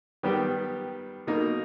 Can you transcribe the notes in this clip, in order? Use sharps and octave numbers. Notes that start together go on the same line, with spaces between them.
D#3 G3 B3 G4
B2 A#3 D#4